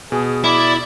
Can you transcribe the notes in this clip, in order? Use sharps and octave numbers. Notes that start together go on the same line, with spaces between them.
B2 G#4
E4 D5 B5